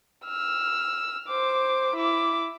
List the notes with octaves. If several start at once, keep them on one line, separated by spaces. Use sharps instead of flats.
E6 F6
C5 D6
E4 D6